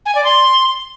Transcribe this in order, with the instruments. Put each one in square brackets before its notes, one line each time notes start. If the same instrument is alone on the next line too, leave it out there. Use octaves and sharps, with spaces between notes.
[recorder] G#5
D5
C6